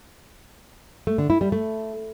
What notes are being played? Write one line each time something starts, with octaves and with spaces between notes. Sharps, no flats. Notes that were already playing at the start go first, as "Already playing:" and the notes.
A3
D3
E4
G3
A3